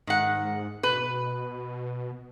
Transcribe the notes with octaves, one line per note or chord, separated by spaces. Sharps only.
G#2 D#3 F#5
B2 B4